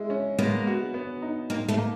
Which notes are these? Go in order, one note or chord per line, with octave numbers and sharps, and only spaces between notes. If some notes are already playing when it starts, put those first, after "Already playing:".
Already playing: G#3 E4
C#4
G#3 A#3 B3
F#4
B3
D#4
A#3 C4 D#4
A3 B3
A#3